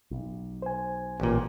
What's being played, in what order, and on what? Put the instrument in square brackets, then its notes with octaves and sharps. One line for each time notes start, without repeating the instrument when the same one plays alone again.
[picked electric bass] B1
[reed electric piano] C5 G#5
[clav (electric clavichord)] A1 A#2